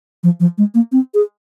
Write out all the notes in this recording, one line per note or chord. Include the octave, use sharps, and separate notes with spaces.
F3
F3
G#3
A#3
C4
G#4